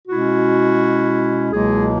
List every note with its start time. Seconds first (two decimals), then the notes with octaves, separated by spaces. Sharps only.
0.08 B2 G#3 C#4 E4 F#4
1.52 C#2 B2 F#3 G#3 A#3 E4 G#4